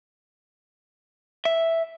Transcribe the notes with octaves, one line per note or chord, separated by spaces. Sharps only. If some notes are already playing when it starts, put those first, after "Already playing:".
E5